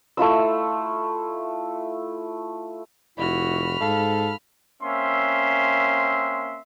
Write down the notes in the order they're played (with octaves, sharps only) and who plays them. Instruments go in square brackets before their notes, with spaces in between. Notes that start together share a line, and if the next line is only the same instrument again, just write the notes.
[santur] A3 E4 F4 E6
[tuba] F1 [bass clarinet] E4 [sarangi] F#4 [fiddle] B5 F6
[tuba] G#2 [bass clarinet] A4 [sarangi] F5
[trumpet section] A#3 C4 C#4 E5 C6